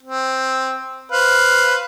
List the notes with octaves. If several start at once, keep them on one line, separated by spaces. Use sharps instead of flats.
C4
B4 C5 F5